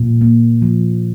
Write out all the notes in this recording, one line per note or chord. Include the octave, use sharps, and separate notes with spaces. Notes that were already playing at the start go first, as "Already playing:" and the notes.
Already playing: A#2
A#3
F3